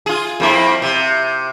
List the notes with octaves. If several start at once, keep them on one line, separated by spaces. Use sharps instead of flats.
F4 G#4
F2 A#3 E4
C3